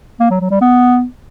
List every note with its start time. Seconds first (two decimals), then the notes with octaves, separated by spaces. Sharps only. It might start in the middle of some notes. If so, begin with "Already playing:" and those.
0.20 A#3
0.30 F#3
0.41 F#3
0.51 G3
0.61 B3